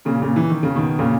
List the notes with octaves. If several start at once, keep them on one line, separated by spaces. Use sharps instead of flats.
A#2 C#3
A#2 C#3
E3
D#3
C#3
B2 D#3
A#2 C#3